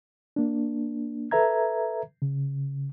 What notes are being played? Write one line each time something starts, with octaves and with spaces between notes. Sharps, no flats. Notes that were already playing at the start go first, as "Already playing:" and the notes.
A#3 D4
A4 B4 E5 A#5 G#6
C#3